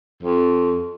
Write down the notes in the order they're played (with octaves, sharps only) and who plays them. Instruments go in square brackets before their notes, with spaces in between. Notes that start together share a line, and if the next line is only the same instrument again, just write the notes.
[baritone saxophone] F2